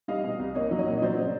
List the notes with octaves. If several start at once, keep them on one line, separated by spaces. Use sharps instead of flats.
G3 D#5 F5
B2
C2
A#3 C#5 D#5
F#3
C#5 D#5
A#2
D#5
F#3 C5 D5
C#3